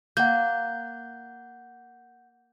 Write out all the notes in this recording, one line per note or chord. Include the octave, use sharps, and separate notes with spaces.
A#3 F#5 G6